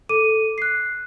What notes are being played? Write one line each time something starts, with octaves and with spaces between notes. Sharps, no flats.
A4 D6 D#7
F#6 C7